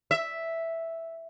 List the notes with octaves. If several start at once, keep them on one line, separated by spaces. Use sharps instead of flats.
E5